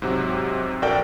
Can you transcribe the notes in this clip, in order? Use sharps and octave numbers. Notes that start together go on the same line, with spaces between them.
G#2 C3 F#3
A#1 F#4 A4 A#4 D5 G5